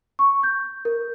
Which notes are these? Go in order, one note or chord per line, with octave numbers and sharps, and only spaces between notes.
C#6
G6
A#4